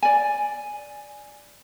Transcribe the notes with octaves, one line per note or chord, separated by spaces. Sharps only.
D5 G#5